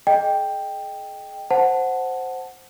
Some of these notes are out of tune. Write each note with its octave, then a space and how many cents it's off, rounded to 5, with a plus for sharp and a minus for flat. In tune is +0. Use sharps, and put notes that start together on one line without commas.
G#4 +45 D#5 -10 G5 +5
C5 +0 F#5 +0 A5 +0